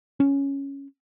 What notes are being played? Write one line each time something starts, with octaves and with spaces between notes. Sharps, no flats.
C#4